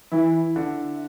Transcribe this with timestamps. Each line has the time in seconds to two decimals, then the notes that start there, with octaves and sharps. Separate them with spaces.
0.12 E3 E4
0.56 D3